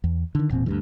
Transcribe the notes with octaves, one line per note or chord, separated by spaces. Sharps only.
E2
D3 D#3
E1 A#2 C4
D2 G2 E3